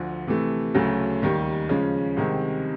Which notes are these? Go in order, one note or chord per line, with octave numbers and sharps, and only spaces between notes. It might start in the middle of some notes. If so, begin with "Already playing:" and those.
Already playing: D2 D3 F3
C3 E3 A3
D2 C#3 F#3 A3 C#4
D#2 D#3 G3
C#3 F3 G#3 C#4
C2 C3 D#3 G#3 C4